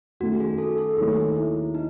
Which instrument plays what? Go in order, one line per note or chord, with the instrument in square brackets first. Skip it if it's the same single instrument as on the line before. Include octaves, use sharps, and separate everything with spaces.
[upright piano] F#2 D#3 A3 [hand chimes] F#4
[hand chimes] G#4
A4
A4
[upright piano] D#2 D#3 F#3 A3 [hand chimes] G#4
[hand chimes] E4
D#4